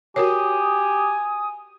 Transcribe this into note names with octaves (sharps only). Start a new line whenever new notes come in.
F#4 G4 A#4 C#5 G#5 D#6